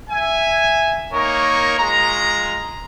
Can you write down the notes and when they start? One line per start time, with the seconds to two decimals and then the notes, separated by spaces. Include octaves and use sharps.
0.10 E5 G#5
1.12 A#3 D#4 A#4 C#5 C#6
1.78 G#3 F4 A#5